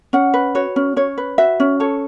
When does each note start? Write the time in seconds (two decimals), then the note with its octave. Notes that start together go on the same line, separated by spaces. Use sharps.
0.13 C#4 F#5
0.34 B4
0.55 F#4 C#5
0.76 C#4
0.96 C#4 C#5
1.18 B4
1.38 F#4 E5
1.60 C#4
1.80 A4 C#5